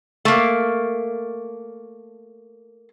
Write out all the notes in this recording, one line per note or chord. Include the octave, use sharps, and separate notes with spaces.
A3 A#3